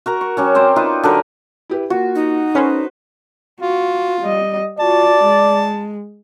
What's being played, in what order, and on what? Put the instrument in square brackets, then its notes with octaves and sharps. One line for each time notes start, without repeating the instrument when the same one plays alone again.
[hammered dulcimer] F#4 A#4 A#5
C#6
F#3 C#4 G4
C4 C5 D5
D#4 F4 B4
D3 F#3 A#4 B4
[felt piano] E4 G4 B4
[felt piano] A#3 F4 [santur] F#4
[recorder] D#4
[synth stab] C#4 [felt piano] A4 [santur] B4 C5
[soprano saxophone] F4 [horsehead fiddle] F#4
[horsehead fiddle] G3 D#5
[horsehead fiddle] F4 F#4 [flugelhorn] D5 [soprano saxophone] A5
[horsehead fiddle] G#3